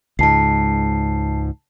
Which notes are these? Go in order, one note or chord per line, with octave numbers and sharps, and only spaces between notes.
C#2 G#2 A5 C7